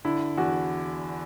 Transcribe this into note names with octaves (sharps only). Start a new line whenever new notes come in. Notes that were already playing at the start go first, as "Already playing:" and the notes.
D3 E4
E2 F#4